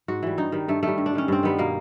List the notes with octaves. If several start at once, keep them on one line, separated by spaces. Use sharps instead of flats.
G#2 F#4
E3 G3
G2 D#4
D#3 G3
G2 A3
D#3 G3 A3
G2
D4
D#3 G3 C#4
G2 C4
D#3 G3 B3
B2 A#3